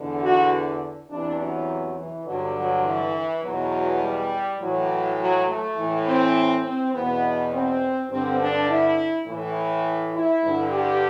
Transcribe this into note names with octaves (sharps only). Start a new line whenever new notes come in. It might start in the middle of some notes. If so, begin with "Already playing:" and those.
Already playing: E2 D3
F#4
E2 C3 E3 D4
F#3
E3
G2 D3 F#3
F#3
E3
E2 B2 F#3
G3
A2 E3 F#3
F#3
A3
A2 E3
C4
C4
E2 B2 B3
C4
G2 D3 C4
D4
E4
A2 E3
E4
G2 D3
G4